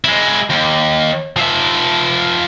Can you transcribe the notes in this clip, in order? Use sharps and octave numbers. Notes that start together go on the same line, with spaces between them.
G#3 E4
D#2
F3 E5